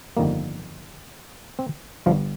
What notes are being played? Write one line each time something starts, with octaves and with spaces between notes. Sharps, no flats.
G1 F2 D#3 G3 A#3
C4
G1 G2 F3 G3 F4